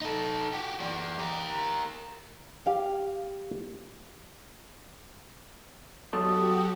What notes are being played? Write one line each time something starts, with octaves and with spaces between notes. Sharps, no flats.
D#4 A4
F#4 G4
E3 D5
G4 A#4
G4 F5 G5
F#3 F#4 G4 A4 A5 D#6